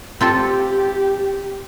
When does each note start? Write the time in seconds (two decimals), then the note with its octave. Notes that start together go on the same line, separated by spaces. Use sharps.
0.21 C4 F4 G4 A4